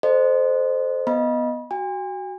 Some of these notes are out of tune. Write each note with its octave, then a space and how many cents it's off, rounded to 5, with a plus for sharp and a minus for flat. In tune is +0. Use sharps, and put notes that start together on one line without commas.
A4 +0 C5 -10 D#5 -35
B3 +0 D#5 +0 B5 -35
F#4 +15 G#5 -45